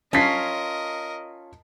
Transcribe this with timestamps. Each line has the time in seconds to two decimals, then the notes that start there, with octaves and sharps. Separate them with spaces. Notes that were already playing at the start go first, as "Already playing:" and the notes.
0.13 C#4 F4 A#4 D#5 A5 B6 C7